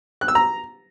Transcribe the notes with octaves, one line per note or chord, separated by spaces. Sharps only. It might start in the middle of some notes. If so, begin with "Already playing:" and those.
F#6
E6
A#5